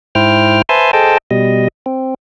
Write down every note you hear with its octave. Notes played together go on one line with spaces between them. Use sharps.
G#2 E4 C5 G5 F6
B4 C5 E5 G#5 A5 C6
G#4 A4 C5 D#5 G5 A5
B2 G3 D#5
C4